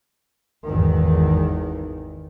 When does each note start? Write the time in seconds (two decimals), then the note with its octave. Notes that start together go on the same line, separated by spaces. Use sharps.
0.66 G#1 E2 D#3